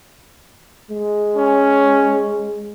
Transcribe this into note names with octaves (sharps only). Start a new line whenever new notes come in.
G#3
C#4